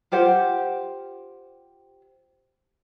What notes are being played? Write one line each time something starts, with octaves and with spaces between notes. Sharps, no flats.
F4 G4 C5 F#5